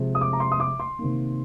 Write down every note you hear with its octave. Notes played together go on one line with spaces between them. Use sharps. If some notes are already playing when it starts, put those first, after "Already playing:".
Already playing: C3 F3 G#3
D#6
D6
A#5
C6
D#6
D6
C6
C3 D#3 A#3